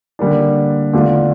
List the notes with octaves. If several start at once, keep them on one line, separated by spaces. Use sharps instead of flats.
D3 G3 A#3 D4
E2 D3 A3 D4 F4